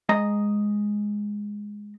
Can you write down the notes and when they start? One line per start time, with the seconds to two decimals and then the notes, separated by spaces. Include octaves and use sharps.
0.09 G#3 D#5 A#5